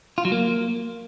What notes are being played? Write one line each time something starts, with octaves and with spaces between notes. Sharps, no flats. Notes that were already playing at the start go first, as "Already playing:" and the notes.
F4
F#3
A#3